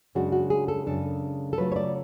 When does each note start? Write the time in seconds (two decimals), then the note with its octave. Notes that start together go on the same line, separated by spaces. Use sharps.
0.15 F#2 C#3 G#3 D4 F#4
0.32 F#4
0.50 G#4
0.68 A4
0.86 F#2 C#3 G#3 D4 A4
1.53 A4
1.58 C#3 F#3 A3 F4 B4
1.72 C#5
1.76 D5